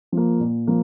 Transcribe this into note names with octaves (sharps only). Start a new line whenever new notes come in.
F3 A#3
A#2
F3 A#3